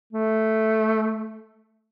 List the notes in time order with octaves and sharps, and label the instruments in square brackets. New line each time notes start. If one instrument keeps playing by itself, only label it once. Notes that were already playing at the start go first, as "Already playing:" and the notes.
[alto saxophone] A3